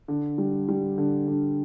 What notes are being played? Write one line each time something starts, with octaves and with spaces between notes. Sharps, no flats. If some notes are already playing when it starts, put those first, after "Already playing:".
D3
G3
G3
D3
D3